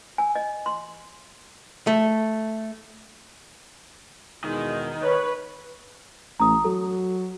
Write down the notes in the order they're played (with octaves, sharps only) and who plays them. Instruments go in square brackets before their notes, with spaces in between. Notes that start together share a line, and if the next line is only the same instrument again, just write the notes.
[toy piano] G#5
D#5
C6
[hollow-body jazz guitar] A3
[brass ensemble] E2 B2 G#3 [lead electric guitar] D#3
[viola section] B4 [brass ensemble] C#5
[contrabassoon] A1 [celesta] A#5 D#6
[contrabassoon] F#3 [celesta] A4